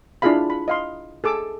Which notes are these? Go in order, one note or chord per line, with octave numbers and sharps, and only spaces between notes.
D4 E4 F4 G#4 F5 B5
B5
D#5 F5 C6
G#4 A4 D6 E6